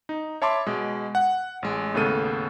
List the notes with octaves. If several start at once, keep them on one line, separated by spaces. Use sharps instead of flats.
D#4
C#5 E5 A5 B5 C6 D6
B2 G#3
F#5
A1 G#3
D#2 A2 C#3 B3 A4 D#7